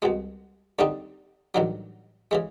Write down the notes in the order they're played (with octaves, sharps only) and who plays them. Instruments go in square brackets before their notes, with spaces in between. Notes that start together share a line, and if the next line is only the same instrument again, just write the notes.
[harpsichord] C2 B2 G#3
D#2 D3 G3 C4 D#4
A1 G2 D#3 F#3
C#3 E3 G#3